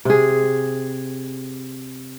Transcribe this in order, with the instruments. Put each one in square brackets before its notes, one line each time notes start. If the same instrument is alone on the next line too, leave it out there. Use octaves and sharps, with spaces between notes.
[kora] C3 G#4